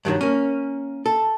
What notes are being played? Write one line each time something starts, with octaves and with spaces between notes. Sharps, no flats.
G2 D#3 F3 F#3
A#3 C#4
A4